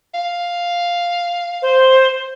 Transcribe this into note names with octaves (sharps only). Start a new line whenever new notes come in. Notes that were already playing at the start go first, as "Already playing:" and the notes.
F5
C5